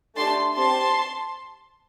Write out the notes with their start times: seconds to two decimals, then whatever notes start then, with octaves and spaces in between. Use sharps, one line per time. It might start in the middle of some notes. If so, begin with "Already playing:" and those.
0.16 A3 D4 G4 A5 C6
0.56 C4 G4 A5 C6